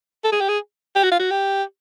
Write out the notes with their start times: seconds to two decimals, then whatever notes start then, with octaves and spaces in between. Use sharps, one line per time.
0.24 A4
0.32 G#4
0.40 G4
0.49 G#4
0.95 G4
1.04 F#4
1.11 F4
1.19 F#4
1.31 G4